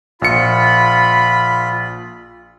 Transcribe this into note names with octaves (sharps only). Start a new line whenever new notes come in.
A#1 F4 B5 C#7